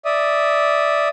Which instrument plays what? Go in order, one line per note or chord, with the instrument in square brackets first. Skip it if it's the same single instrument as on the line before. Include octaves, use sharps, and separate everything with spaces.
[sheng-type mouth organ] D5 E5 D#6